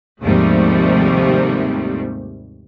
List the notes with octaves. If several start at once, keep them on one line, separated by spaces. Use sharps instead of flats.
D#2 G#2 C3 F3 G3 A3